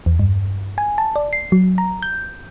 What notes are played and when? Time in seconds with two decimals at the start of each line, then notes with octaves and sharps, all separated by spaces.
0.06 E2
0.19 G2
0.78 G#5
0.98 A5
1.16 D5
1.33 C7
1.52 F#3
1.78 A#5
2.02 G6